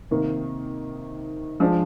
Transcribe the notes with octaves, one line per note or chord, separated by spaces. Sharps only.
C3 D#3 A#3
F3 G#3 D4